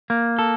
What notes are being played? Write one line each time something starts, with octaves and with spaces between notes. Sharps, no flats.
A#3
A4